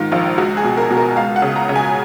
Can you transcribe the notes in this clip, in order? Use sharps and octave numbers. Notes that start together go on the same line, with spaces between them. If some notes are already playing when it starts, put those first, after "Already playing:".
Already playing: G#2 D#3 F4
A#1 F4
C#2 F#4
G#4
B2
A#4
B2
A#4
C#2 F5
F#5
C#3
A#5
C#3
G#5